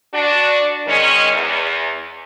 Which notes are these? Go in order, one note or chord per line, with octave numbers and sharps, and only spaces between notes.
D4 F#4
D#3 G#3 C#4
E2